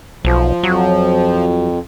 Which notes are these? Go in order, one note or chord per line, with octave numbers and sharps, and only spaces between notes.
B1 F3
F2 F#3